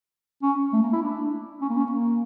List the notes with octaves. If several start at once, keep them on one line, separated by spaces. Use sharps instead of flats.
C#4
A3
A#3
E4
D4
C#4
A#3
C#4
A#3